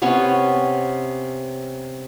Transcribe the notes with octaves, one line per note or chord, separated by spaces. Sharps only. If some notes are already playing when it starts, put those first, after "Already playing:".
C3 B3 C#4 C#5